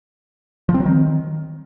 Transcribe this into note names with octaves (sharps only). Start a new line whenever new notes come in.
F3
C4
F#3
D#3